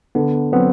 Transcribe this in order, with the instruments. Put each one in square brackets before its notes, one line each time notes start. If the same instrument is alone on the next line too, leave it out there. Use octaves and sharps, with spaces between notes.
[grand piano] D3 [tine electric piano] B3
[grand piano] F#3 C4 [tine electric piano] B3